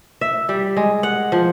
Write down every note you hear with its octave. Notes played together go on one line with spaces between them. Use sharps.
E5
G3
G#3
F#5
F3